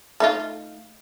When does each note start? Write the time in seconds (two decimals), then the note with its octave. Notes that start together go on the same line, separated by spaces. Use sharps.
0.20 A3 D#4 F4